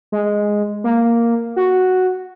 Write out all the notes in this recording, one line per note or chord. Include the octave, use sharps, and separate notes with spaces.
G#3
A#3
F#4